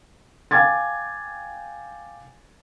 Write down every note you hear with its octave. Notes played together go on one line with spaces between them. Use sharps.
F5 G5 G#5 D6 G#6 A6